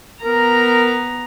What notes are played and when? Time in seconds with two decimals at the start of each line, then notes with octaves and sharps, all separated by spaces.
0.23 B3 A#4 A#5